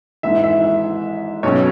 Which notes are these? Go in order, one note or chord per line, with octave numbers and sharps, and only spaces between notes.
G#1 G#2 E3 E5
E5
B1 B2 F#3 C#4 C#5